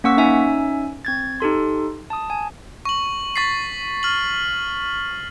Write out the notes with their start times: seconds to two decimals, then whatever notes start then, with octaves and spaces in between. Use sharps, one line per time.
0.04 A#3 C#4 F#5 C#6 E6 B6
0.17 C#4 D#4 E5 G#5 E6
1.05 C4 G#6 A6
1.40 D#4 G4 A4 C6
2.10 A5 D#6
2.30 G#5
2.85 C#6 F#7
3.36 C#6 A6 B6 C7
4.03 F6 F#7